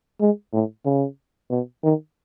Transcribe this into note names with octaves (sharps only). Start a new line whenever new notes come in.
G#3
A2
C#3
B2
D#3